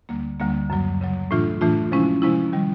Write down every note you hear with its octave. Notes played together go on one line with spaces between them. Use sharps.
D2 D3 G3 A#3
D2 D3 G3 A#3
F#2 C#3 F#3
F#2 C#3 F#3
A2 E3 A3 D4 F4
A2 E3 A3 D4 F4
C3 F3 G#3 C#4 E4
C3 F3 G#3 C#4 E4
D#3 G3